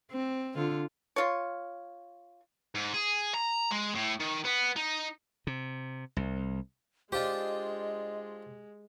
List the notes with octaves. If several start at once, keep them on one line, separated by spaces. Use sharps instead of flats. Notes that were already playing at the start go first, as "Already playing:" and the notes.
C4
D3 F4
F4 C#5
G#2
G#4
A#5
G#3
A2
D#3
B3
D#4
C3
C2
G#3 D4 F4 G4 C5 D#5